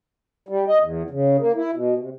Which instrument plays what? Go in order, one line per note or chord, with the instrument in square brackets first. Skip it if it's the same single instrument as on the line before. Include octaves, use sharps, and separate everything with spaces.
[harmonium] G3
D#5
E2
C#3
A#3
E4
B2
C3